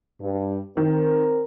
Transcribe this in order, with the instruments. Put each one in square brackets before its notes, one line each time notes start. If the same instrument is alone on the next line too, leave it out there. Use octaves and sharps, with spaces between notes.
[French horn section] G2
[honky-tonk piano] D#3 [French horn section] C4 A#4